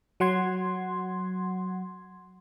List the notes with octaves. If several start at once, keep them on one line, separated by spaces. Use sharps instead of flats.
F#3 F#5 C6 G#6